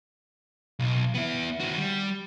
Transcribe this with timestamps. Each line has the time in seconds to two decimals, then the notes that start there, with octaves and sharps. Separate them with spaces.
0.79 B1
1.15 B3 E4
1.60 D#3 F#4
1.77 G3